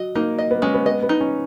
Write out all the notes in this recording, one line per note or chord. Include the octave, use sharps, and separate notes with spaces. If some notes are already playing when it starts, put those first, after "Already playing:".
Already playing: F#3 D#5
A#3 D#4
D#5
B3
G#3 C#4
B3
B3 D#5
B3
D#4
C#4